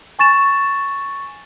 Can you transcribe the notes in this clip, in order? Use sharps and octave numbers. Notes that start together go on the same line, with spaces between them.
G#5 C#6 A6 E7